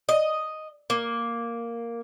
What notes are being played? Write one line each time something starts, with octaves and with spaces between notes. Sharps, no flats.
D#5
A#3